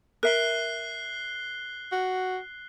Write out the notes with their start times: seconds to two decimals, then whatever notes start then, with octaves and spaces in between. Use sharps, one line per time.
0.23 A#4 E5 F#6 C7 G7
1.92 F#4